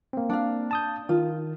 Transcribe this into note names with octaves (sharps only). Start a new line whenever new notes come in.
A#3 C4
D4 F5
A5 D#6 G6
D#3 F4